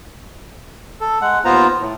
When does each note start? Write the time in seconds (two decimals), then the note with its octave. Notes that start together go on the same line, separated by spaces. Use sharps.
1.00 A4
1.22 G#3 F#5
1.45 D#2 B3 F4 C5 A#5
1.81 A2